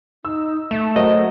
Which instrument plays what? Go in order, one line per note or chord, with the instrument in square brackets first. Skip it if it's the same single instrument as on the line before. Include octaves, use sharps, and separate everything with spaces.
[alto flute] D#4 [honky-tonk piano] E6
[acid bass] A3 [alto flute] E5 [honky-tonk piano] E7
[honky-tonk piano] F#3 A#4 F#5 [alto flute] C5 [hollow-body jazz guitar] D#5